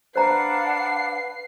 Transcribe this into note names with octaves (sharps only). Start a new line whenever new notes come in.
D4 B4 C5 F5 F#5 A#5 C7